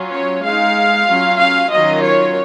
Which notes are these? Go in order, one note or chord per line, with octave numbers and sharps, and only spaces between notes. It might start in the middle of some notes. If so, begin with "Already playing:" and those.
Already playing: F#3 C#4 F4
C#5
G#3 D#4 F5
F#3 C#4 F4
F5
D#3 F#3 C#4 F4 D#5
C#5